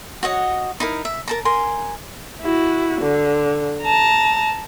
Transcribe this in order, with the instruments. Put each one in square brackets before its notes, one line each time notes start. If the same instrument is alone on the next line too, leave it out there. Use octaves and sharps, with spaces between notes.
[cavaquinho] F#4 C#5 D#5 F#5
D#4 E4 A#4
E5
A#4 A5 A#5
A#4 G#5 C6
[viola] E4 F#4
D3
A5 A#5